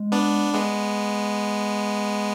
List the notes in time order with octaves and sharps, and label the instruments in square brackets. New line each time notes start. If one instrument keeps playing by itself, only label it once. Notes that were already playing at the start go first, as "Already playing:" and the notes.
Already playing: [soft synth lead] G#3
[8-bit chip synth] B3 D4
G#3 B3